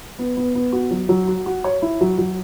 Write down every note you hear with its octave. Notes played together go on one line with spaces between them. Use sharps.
B3
B3
B3
F#4
F#3
F#3
F#4
F#4
C#5
E4
F#3
F#3